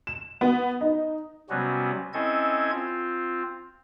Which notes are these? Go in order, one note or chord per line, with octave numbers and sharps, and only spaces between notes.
E7
B3
D#4
C3 F#3 G3 B3 C#4 F#4
C4 C#4 E4 A4 D#5 G#6
C4 F4